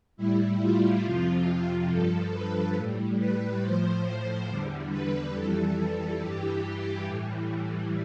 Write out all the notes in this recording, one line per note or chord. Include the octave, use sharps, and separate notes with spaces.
A2 G3 E4
F4
F2 C3 F3
G2 F3 A4
B4
A2 G3
B4
A2 F3 C5
E2 D3 G3
B4
F2 E3 G3 A4
G2 E3 G3 G4
A2 E3 G3